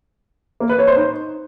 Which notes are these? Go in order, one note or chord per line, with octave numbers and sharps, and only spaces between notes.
A#3
B4
C#5
C5
D#4